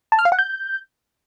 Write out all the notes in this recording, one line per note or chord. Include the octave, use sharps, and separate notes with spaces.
A5
F6
F5
F#5
G6